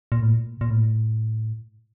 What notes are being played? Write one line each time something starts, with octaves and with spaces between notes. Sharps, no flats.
A#2
A2
A#2
A#2
A2